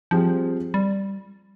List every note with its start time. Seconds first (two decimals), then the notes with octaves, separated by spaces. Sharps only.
0.11 F3 G3 C4 F4 G#4
0.74 G3